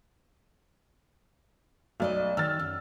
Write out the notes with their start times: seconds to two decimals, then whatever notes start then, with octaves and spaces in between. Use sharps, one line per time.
2.00 B1 A3 D5 D#5
2.37 D#3 E6 F6 A6
2.59 F#2